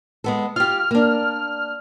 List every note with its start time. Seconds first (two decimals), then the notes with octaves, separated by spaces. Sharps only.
0.24 G#3 B3 A4
0.56 F4 G4 F6
0.91 A#3 D4